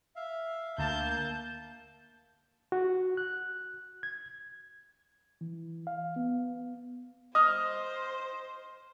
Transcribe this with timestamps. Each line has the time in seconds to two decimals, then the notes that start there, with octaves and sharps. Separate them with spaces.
0.16 E5 F5
0.78 D2 A#3 A5 G6
2.72 F#4
3.17 F#6
4.03 G#6
5.41 E3
5.87 F5
6.16 B3
7.35 C5 D#5 D#6 F6